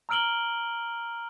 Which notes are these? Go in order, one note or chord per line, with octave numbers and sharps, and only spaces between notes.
A#5 E6 F6 D7 F#7 G7